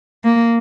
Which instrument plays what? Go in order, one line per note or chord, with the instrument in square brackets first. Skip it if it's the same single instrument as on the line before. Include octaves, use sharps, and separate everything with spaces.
[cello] A#3